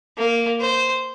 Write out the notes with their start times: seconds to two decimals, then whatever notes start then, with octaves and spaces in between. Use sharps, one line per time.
0.18 A#3
0.61 C5